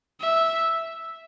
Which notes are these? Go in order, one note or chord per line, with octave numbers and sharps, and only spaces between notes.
E5